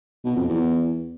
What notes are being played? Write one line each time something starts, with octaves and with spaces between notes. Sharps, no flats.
B2
F2
E2